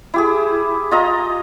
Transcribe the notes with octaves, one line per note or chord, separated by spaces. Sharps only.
E4 G4 G#4
F4 D#5 A#5